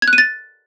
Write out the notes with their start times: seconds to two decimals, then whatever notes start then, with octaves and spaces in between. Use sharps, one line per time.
0.02 G#6
0.08 F#6
0.13 D#7
0.18 A6